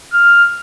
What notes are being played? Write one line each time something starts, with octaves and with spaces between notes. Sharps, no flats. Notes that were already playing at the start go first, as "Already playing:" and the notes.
F6